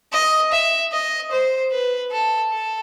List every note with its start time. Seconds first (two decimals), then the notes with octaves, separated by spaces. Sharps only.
0.12 D#5
0.52 E5
0.92 D#5
1.32 C5
1.72 B4
2.12 A4
2.52 A4